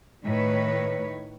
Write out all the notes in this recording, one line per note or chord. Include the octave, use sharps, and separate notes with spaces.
A2 D#3 B4 C#5